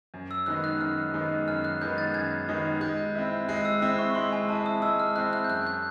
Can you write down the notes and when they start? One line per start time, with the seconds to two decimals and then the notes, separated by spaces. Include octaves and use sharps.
0.14 F#2
0.31 E6
0.46 D#3 G#3 B3 D#4 F#6
0.64 F#6
0.81 F#2 F6
1.14 D#3 G#3 B3 D#4
1.48 F#2 F6
1.64 F#6
1.81 D#3 G#3 B3 D#4 G6
1.98 A6
2.14 F#2 G#6
2.48 D#3 G#3 B3 D#4
2.81 G#3 G6
3.15 C4 E4
3.49 G#3 F#6
3.65 E6
3.82 C4 E4 D#6
3.99 C#6
4.10 C#6
4.15 G#3 C6
4.33 G#5
4.48 C4 E4 A5
4.66 D#6
4.82 G#3 E6
5.00 F6
5.16 C4 E4 F#6
5.33 F#6
5.44 G6
5.50 F#2 F#6
5.67 G6